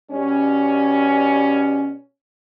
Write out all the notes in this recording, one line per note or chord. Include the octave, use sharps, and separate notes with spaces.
B2 G3 C#4